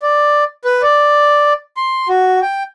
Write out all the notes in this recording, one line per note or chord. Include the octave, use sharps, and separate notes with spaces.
D5
B4
D5
C6
F#4
G5